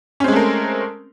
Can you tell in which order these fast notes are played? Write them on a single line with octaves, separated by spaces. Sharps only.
C#4 C4 G#3 A3 A#4